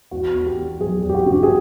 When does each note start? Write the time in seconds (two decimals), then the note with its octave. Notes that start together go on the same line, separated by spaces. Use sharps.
0.11 E2 F#4
0.35 E2
0.46 G4
0.57 E2
0.80 F#3 G#4
0.98 G4
1.04 E2
1.09 G4
1.15 F#4
1.26 C#3
1.32 G4
1.43 G#4